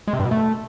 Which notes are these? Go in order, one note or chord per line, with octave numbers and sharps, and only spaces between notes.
G#3
C3
G2
B2
A3